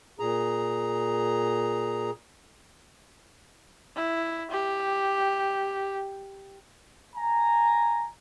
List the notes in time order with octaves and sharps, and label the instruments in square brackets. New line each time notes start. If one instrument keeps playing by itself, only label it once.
[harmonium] A#2 G#4 A#5
[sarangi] E4
G4
[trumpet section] G#5 A#5